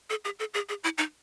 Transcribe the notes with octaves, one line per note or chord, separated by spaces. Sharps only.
A4
G#4
A4
G#4
G#4
E4
D#4